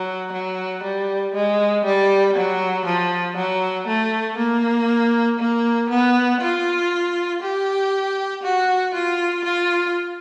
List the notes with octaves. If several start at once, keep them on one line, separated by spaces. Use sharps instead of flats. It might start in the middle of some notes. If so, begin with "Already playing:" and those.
Already playing: F#3
F#3
G3
G#3
G3
F#3
F3
F#3
A3
A#3
A#3
B3
F4
G4
F#4
F4
F4